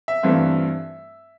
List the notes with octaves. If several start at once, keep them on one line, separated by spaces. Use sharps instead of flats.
E5
G2 E3 A3 C4 F4